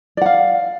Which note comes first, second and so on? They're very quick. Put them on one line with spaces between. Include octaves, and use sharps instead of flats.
D5 F#5 F5